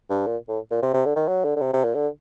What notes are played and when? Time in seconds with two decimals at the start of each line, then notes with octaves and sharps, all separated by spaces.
0.10 G2
0.26 A#2
0.49 A2
0.71 A#2
0.83 C3
0.94 C3
1.05 D3
1.16 D#3
1.28 F#3
1.45 D3
1.56 D3
1.61 C3
1.73 C3
1.84 A#2
1.95 D3